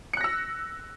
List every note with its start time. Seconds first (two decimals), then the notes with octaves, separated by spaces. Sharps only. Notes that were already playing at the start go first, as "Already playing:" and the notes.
0.13 C#7
0.17 F#6
0.21 A#6
0.24 E6